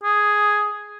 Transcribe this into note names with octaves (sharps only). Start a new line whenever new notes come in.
G#4